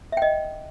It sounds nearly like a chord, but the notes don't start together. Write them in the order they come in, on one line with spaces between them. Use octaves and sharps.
E5 G5 D#5